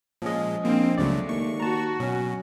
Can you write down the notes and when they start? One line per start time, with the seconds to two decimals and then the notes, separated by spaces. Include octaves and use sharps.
0.22 A#2 F3 G#3 C#4 D#5
0.65 A#1 A#3 C4
0.98 C#2 C#3 F#3 G#3 A3 D5
1.29 D#2 C#6
1.60 F#4 A5 A#5
2.00 B2 F#3 C#4